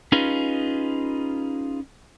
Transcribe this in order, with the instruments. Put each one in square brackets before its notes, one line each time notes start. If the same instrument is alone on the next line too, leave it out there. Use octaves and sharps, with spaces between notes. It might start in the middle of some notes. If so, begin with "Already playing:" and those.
[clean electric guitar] C#4 D#4 F4 G#4 B4